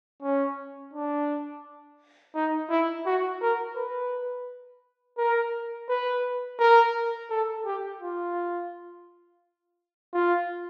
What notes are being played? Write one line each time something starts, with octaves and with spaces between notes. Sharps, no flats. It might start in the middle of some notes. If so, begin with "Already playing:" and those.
C#4
D4
D#4
E4
F#4
A#4
B4
A#4
B4
A#4
A4
G4
F4
F4